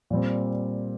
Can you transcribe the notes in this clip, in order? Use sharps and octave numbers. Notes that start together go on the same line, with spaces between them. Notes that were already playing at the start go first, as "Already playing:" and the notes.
A#2 G3 C4